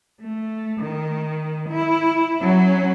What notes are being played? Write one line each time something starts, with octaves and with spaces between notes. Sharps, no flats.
A3
D#3
E4
F#3 C#4